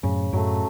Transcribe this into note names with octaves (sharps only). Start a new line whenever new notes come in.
F#2 A2 C#3
F#2 A2 F#3 A3